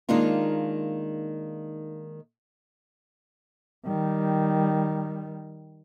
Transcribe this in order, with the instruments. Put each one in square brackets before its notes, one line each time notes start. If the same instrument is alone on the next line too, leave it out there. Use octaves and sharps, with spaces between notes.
[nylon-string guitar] D#3 G#3 A#3 D4 D#4 F4
[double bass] D#3 G3